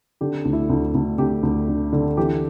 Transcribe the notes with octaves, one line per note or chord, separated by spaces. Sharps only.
D3 G4
D2
E4
D2
D2
D2 G4
D2
D3
D3
E3 G4